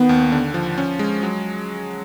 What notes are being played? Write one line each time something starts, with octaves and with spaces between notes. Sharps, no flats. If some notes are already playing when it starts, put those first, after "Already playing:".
Already playing: D#3 B3
D#2
D3
F3
C#4
G#3
F#3